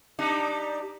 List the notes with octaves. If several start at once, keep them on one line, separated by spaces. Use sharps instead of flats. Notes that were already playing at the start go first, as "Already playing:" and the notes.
G3 D4 D#4